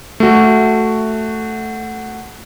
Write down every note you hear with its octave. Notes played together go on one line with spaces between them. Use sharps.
A3 F#4